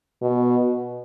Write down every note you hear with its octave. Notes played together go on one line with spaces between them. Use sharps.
B2